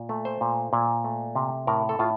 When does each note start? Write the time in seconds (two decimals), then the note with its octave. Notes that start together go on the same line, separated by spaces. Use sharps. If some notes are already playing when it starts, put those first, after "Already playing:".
Already playing: A#2
0.09 A3
0.25 C5
0.41 A#2
0.73 A#2
1.04 A3
1.35 C3
1.67 A2 A#4
1.89 A4
1.99 A2 F4